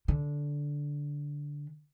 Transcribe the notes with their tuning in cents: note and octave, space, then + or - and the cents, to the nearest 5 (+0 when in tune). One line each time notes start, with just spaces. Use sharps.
D3 -10